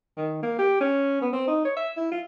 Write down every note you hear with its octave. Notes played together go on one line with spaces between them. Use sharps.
D#3
A#3
G4
C#4
B3
C4
D#4
C#5
E5
E4
F4